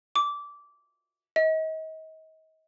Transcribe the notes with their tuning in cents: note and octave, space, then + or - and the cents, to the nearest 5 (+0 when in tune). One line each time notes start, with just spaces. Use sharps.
D6 -15
D#5 +35